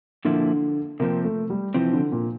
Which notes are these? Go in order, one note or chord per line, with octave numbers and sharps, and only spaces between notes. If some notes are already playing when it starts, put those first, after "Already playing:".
A#2 D3 F3 A#3 E4
C3 F3 A#3 C4
A3
G3
C3 E3 F3 C4
D3
A#2